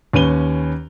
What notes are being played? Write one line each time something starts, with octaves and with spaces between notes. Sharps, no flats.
D#2 C#4 B4 D#7 G7